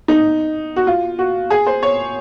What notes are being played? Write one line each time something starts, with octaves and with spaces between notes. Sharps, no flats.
D#4
F#4
F4
F#4
G#4
C5
C#5